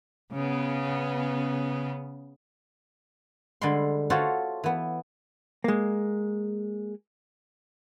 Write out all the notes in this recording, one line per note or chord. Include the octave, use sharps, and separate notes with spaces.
C#3 B3
D3 G3 G#3 B5 C6
F4 F#4 A4 C5 C#5 E5
E3 B3
G#3 A#3